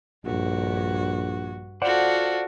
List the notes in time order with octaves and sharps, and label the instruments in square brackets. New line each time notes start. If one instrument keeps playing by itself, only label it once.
[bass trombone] A#1 [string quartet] G2 F#4
[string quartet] F4 F#4 A4 [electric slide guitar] C5 D5 F#5